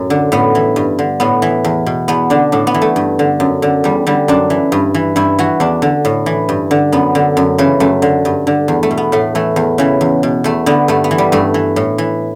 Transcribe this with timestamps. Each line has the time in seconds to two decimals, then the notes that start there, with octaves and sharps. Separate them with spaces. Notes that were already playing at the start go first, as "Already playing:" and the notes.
Already playing: F#2 A2
0.10 D3
0.32 A2 B3
0.55 E3
0.76 G2
0.99 D3
1.20 A2 B3
1.42 E3
1.64 E2
1.86 B2
2.08 E2 B3
2.30 D3 D4
2.52 A2 D4
2.67 B3
2.74 E3
2.82 A3
2.96 G2
3.19 D3
3.40 F#2
3.62 D3
3.84 E2 G3
4.07 D3 G3
4.28 F#2 D4
4.50 E3
4.72 G2
4.94 E3
5.16 G2 E4
5.39 E3 F#4
5.60 E2 D4
5.82 D3
6.05 A2
6.26 E3
6.49 G2
6.71 D3
6.92 F#2 B3
7.15 D3
7.37 F#2
7.58 C#3 E3
7.80 F#2 A3
8.02 D3
8.25 G2
8.47 D3
8.68 E2
8.83 A3
8.91 B2
8.97 B3
9.12 A2 A3
9.35 E3 A3
9.56 E2
9.78 C#3 E3
10.01 E2
10.23 B2
10.44 E2 A3
10.66 D3 B3
10.88 G2 A3
11.04 B3
11.11 E3
11.18 G3
11.32 G2 A3
11.54 E3
11.76 A2
11.98 E3